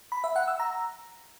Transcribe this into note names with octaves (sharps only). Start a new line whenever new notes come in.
B5
E5
F#5
E6
A#5